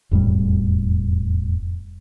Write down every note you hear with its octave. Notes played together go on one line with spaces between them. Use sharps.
E1 F2 A2 G3